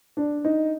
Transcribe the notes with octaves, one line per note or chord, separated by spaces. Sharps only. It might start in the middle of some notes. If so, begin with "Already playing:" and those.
D4
D#4